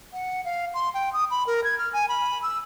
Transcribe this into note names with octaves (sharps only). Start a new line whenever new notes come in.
F#5
F5
C6
G5
D#6
B5
A#4
G#6
F6
G#5
B5
E6